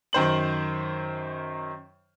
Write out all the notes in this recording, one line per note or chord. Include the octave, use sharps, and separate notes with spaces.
F#2 D#3 C5 F#7